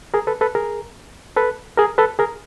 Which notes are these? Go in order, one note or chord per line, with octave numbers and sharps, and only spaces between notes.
G#4 A#4
A4 B4
A4 B4
G#4 A#4
A4 B4
G#4 A#4
A4 B4
G#4 A#4